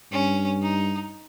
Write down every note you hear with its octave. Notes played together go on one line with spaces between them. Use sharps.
G2 C#4
D#4